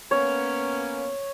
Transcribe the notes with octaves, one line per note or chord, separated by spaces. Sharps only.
A#3 B3 C#4 C#5